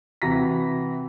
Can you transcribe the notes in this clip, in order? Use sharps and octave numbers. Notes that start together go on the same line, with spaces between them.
C3 E3 F#4 A#5 A#6 B6